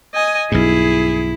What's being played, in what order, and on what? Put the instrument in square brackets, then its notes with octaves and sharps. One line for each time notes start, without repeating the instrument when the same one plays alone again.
[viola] D#5 G#5
[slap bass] B1 G2 [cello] E4 [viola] G#4